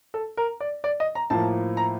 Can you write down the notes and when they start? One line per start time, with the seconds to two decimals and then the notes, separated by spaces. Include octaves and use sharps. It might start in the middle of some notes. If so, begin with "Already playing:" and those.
0.14 A4
0.37 A#4
0.60 D5
0.84 D5
1.00 D#5
1.15 A#5
1.30 A2 F3 A#3 A5
1.77 A#5